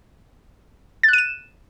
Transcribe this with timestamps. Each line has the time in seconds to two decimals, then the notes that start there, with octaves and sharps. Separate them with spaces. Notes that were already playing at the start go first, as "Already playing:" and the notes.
1.03 A6
1.08 F#6
1.13 D#7
1.18 E7